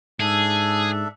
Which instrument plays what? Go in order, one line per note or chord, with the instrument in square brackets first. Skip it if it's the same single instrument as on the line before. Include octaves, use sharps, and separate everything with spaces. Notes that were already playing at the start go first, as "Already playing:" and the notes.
[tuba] G#2 [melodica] D4 A4 E5 [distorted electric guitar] G#4